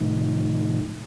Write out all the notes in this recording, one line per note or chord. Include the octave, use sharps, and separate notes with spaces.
A2 C3 D#3 F3 A3 D#4